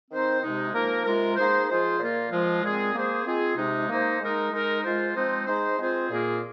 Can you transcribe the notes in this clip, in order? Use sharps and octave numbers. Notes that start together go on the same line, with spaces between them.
D#3 C4 D#4 C5
C3 G#3 D#4
F3 A#3 D#4 A#4
C3 G#3 F4 A#4
A#3 D#4 G#4 C5
F3 G#3 F4 G#4 C5
A#2 A#3 F4 A#4
F3 G#3 F4
A#2 G#3 C4 G#4
A#3 G#4 C5
G#3 C4 F4 G#4
C3 G#3 D#4
A#3 D#4 C5
G#3 D#4 A#4
G#3 D#4 A#4
G#3 F4 C5
F3 G#3 C4 D#4 C5
G#3 D#4 G#4 C5
G#3 C4 F4 G#4 C5
A#2 A#3 G#4